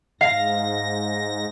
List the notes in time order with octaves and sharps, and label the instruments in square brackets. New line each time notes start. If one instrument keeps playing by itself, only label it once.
[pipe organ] G#2 A#6 [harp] F5